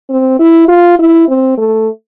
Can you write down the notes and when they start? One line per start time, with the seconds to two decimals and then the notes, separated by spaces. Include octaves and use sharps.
0.10 C4
0.39 E4
0.68 F4
0.99 E4
1.29 C4
1.58 A3